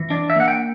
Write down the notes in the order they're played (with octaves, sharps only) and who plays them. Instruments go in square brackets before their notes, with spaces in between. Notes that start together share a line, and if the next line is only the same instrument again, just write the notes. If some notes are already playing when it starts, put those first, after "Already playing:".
Already playing: [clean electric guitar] E3
D4 D5
E5
A#3 F#5
G5